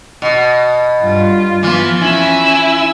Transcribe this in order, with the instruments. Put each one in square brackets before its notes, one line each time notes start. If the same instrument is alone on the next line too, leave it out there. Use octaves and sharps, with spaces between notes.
[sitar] B2
[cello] G2 F4
[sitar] E3 F4 [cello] F3 B3
[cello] C#4 [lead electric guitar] E4 [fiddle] G#5 E6